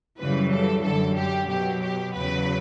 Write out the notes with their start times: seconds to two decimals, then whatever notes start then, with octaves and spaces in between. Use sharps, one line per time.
0.18 F#2 C#3 E3 G3 B4
0.51 A4
0.84 F#2 D3 G3 A4
1.17 G4
1.49 B2 F#3 G4
1.82 G4
2.14 E2 C#3 F#3 B4